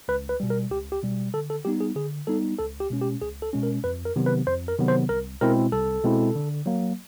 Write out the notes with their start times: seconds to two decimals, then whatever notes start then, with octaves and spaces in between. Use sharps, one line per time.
0.08 C#2 B4
0.29 B4
0.40 B2 G3
0.50 A#4
0.71 C#2 G4
0.92 G4
1.03 B2 G3
1.34 D3 A4
1.50 A4
1.65 G3 B3 D#4 G4
1.80 G#4
1.96 D3 G#4
2.27 G3 B3 D#4 A4
2.58 C#2 A4
2.80 G4
2.90 B2 G#3 C#4
3.01 G4
3.22 C#2 G#4
3.42 A4
3.53 B2 G#3 C#4
3.63 A#4
3.84 F2 B4
4.05 A#4
4.16 C3 D#3 F#3 B3
4.26 B4
4.47 F2 C5
4.68 A#4
4.78 C3 D#3 F#3 B3
4.88 C5
5.09 C2 A#4
5.41 B2 G#3 C4 E4 A#4
5.72 C2 A4
6.04 B2 G#3 C4 E4
6.35 D3
6.66 F#3 A#3